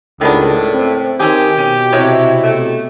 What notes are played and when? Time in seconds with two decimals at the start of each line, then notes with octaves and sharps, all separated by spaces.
0.21 C#2 A2 D#3 B3 D4
0.73 C4
1.20 D#3 C4 C#4 G4 G#4
1.58 B2 C#4
1.93 C3 G#3 E4 C#5
2.43 A3